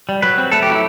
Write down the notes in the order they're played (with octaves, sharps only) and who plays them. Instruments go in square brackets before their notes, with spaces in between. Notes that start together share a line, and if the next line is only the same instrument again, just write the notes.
[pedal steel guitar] G3
F#3 B4
C4
A3 A4
G4
F#3 E4